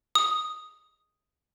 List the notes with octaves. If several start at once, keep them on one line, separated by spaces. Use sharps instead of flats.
D#6